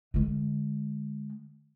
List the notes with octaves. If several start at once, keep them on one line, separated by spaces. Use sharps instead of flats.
D3 G#3